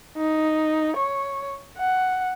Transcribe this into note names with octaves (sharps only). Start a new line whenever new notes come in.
D#4
C#5
F#5